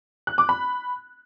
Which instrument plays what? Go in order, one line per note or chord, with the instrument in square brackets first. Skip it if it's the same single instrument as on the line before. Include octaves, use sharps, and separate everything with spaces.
[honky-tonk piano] F#6
D6
B5